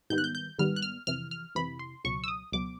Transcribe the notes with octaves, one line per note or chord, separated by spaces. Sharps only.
G#2 D#3 G3 B3 G6
F#6
G6
G6
G#2 D#3 G3 B3 F6
F#6
F6
F2 C3 E3 F6
F6
F2 C3 E3 B5
C6
C#2 B2 F#3 C#6
E6
D#6
C#2 B2 F#3 D6